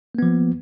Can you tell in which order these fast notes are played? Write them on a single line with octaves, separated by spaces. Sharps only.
A#3 B3 F3